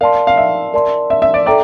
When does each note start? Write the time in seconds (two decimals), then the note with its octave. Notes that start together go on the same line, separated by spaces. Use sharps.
0.01 A#4 D5 F5 A5 C6
0.27 F5
0.37 E5
0.74 A#4 D5 A5 C6
1.10 E5
1.22 E5
1.34 D5
1.46 A4 D5 E5 G5 A#5 D6